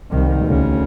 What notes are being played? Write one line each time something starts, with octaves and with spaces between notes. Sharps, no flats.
C2 D#3
D2 C#3